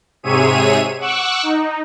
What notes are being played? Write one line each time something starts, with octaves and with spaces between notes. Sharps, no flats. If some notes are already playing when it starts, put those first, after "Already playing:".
G#2 C3 G#4 C#5 E5 D#7
F#5 C#6 D6 E6 F#6
D#4